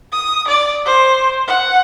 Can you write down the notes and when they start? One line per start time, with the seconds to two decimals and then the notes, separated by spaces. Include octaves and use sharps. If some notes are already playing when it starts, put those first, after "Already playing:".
0.12 D#6
0.48 D5
0.86 C5
1.48 F#5